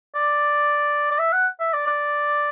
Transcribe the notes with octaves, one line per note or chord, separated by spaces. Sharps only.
D5
D5
E5
F#5
E5
D5
D5